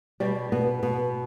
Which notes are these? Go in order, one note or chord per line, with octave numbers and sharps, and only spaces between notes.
B2 G3
B2 B3
B2 B3